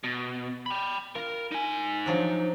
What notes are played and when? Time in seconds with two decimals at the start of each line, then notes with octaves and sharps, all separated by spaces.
0.04 B2
0.66 G5 B5
1.15 F4 A#4
1.51 D#4 G#5
2.06 F3 F#3 D4